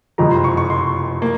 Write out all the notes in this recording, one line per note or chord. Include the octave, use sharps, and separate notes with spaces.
F#1 F2 C3 F3 G#3 A#5
C6
C#6
C#6
C6
A#3